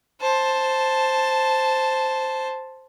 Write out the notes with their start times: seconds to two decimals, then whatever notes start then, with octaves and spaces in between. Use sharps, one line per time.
0.21 C5 A5